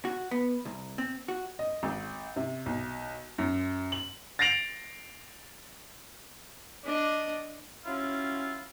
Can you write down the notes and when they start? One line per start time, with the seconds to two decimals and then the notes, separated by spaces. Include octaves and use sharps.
0.05 F#4
0.31 B3
0.65 C2
0.98 C4
1.28 F#4
1.59 D#5
1.83 G#1
2.36 C3
2.66 B1
3.38 F#2
3.92 F#7
4.39 A6 A#6 C7 D7 F7 F#7
6.84 D4 D#5
7.85 F#3 C#4 E4 F4